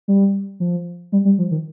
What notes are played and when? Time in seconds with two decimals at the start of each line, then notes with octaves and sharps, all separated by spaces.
0.08 G3
0.60 F3
1.12 G3
1.25 G3
1.38 F3
1.51 D#3